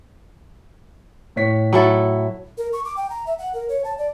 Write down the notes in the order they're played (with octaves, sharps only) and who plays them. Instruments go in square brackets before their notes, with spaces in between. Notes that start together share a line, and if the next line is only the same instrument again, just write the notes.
[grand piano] A2 C#5 B6
[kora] F#3 E4 A4
[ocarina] A#4
C#6
D6
G5
A#5
E5
F#5
A#4
C#5
A5
D5